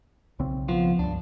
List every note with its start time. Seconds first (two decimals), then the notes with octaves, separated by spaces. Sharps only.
0.39 B1 C#3 C4
0.68 F3 B3 F4
0.99 C#2 G2 D4